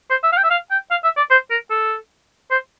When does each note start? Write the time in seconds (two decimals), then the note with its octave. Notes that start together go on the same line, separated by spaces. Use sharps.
0.11 C5
0.24 E5
0.33 F5
0.37 G5
0.44 E5
0.51 F5
0.71 G5
0.91 F5
1.04 E5
1.17 D5
1.31 C5
1.51 A#4
1.71 A4
2.51 C5